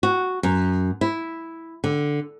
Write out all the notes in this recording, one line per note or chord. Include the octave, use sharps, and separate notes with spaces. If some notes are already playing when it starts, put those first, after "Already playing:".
F#4
F#2
E4
D3